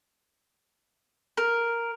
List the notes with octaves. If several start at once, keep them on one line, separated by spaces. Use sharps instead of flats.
A#4